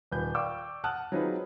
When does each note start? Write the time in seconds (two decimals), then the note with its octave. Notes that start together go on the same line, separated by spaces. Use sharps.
0.12 D#1 B4 G6
0.34 D5 F5 G5 C#6 D6 E6
0.84 F#5 A5 D#6 F6 F#6
1.12 F#3 C4 D#4 F4 G#4 B4